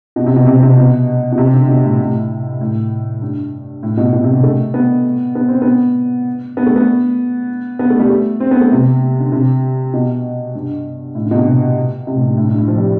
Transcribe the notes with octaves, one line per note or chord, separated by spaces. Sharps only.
B2
C3
B2
C3
C3
B2
B2
C3
D3
B2
A2
A2
A2
G2
A2
B2
B2
C3
D3
A3
B3
B3
C4
B3
B3
A3
B3
B3
A3
G3
A3
C4
B3
A3
C3
D3
C3
B2
G2
A2
D3
B2
C3
C3
A2
G2
A2
G2
A2
F3
G3